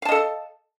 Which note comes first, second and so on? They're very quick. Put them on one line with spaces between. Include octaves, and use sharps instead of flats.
F5 A5 D#5 A4